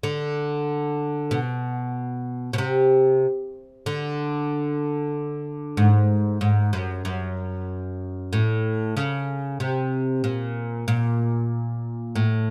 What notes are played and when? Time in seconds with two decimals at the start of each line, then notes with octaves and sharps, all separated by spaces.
0.03 D3
1.31 B2
2.53 B2
2.58 C3
3.86 D3
5.77 G#2
6.41 G#2
6.73 F#2
7.05 F#2
8.33 A2
8.97 C#3
9.60 C3
10.24 A#2
10.88 A#2
12.16 A2